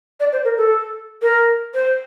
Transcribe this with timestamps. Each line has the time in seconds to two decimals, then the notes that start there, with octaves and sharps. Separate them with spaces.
0.20 D5
0.32 C5
0.45 A#4
0.58 A4
1.22 A#4
1.74 C5